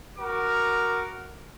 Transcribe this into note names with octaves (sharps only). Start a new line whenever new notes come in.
F#4 A#4 D6